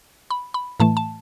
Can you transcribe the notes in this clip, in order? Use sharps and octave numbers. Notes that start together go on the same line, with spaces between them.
B5
B5
A2 E3 A3 A5
A5